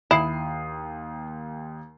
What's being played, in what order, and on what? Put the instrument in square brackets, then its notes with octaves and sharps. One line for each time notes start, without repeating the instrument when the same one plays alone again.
[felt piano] D#2 D#6 C7 [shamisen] E4